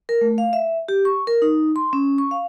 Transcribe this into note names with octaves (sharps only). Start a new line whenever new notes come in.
A#4
A3
F5
E5
G4
C#6
A#4
D#4
C6
C#4
C#6
F5